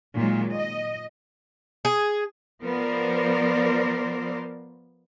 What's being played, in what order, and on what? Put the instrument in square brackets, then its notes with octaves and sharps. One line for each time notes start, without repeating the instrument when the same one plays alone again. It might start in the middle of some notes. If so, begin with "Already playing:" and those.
[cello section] A#2 D#3 F#3 G#3
D#5
[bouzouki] G#4
[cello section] F3 B3 A#4 C5 D5